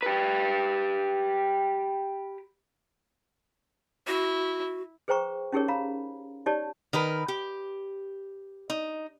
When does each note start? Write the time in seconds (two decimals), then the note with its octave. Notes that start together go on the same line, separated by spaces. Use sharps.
0.03 G4 B4
4.08 E4 F#4
5.08 G#4 B4 C5 G5 A#5 C#6
5.52 C#4 D#4 G4 G#4 A#4 C#5
5.68 F5 A#5 B5
6.46 D#4 G4 C#5 D5 A5
6.93 D#3 A#4 B4
7.28 G4
8.70 D#4